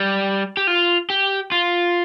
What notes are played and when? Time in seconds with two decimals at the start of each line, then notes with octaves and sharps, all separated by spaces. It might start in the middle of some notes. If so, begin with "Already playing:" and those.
Already playing: G3
0.57 G4
0.67 F4
1.10 G4
1.52 F4